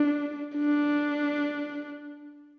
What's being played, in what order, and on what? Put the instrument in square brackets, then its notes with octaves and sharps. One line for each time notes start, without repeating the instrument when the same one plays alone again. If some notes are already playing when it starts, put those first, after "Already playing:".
Already playing: [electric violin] D4
D4